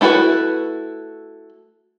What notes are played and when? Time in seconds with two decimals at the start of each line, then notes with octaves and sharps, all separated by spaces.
0.01 A3 E4 F#4 G#4 B4